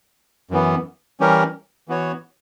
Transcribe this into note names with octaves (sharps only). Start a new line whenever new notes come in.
F#2 E3 B3
E3 G3 C#4 G4 A#4
E3 B3 F#4 C#5